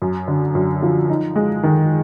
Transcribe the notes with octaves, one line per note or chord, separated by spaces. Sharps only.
F#2
D3
F#2
F3
D#4
G#3
D#3